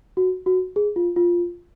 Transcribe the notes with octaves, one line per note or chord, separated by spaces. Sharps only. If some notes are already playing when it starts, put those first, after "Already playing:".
F#4
F#4
G#4
F4
F4